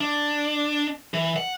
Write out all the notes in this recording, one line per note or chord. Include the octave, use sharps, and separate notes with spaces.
D4
E3
F#5